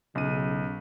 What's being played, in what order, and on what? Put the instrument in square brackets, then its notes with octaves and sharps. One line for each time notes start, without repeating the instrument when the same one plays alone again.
[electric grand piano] B1 D#7 [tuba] C#3